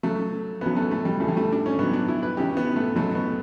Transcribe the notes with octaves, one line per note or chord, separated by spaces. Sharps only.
C#2 C#3 F#3 A3
D2 C#3 F#3 B3
A3
A3
G3
D2 C#3 E3 A3
G3
A3
D4
C#4
G2 D3 F#3 B3
D4
E4
B4
C#2 C#3 E3 G4
B3
A3
C#2 B2 F#3 A3
B3